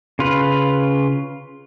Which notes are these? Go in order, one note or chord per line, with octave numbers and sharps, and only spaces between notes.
C#3 F4 B4